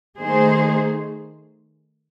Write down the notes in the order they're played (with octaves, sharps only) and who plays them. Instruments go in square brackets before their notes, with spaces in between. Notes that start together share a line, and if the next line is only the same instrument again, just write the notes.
[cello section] D#3 A3 D#4 G#4 C5